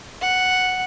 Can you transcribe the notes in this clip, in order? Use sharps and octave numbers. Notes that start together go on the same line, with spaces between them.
F#5